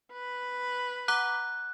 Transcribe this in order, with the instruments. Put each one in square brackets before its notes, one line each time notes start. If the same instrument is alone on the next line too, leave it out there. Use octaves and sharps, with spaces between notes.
[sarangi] B4
[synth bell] F#5 A#5 D6 [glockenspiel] F#6